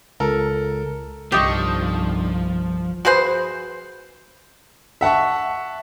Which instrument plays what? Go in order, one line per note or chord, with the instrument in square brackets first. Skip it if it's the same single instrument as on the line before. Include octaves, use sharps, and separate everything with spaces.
[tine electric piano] C#2 [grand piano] A4 A#4
[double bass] G1 C2 [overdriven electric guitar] F3 [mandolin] D4 D#4 C#6 [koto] G4
[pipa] F#4 G#4 B4 C5
[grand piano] E5 F#5 A5 C#6